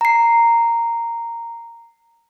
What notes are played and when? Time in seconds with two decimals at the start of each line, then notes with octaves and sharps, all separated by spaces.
0.01 A#5 C7